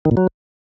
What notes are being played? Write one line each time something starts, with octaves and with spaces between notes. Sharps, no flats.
D#3
A#2
F#3